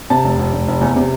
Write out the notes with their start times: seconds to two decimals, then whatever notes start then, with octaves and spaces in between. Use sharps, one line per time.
0.10 C3 A5
0.25 F1
0.39 F1
0.53 F1
0.68 F1
0.81 E2
0.96 C3